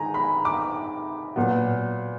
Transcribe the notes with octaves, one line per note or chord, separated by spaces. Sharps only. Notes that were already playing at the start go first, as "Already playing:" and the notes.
Already playing: D#3 G#3 G#5 A#5
B5
D6
A#2 F#3 B3